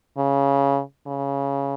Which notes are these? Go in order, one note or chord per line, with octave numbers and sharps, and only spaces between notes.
C#3
C#3